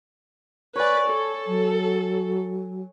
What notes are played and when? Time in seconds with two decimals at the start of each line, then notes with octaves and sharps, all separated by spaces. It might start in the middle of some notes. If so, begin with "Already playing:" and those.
0.76 B4 C#5 D5 G#5
1.07 A4
1.47 F#3